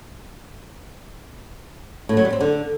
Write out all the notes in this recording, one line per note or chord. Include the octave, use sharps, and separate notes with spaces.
A2
F#3
G3
C4
D3